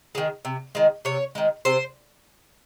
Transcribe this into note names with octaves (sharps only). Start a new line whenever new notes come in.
D#3 G#3
C3
D#3 G#3
C3 C#5
D#3 G#3
C3 C5